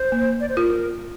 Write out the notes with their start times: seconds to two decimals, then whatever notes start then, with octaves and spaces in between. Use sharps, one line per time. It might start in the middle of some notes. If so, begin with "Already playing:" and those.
Already playing: C5
0.12 A#3
0.40 D5
0.49 C5
0.57 F4 A#4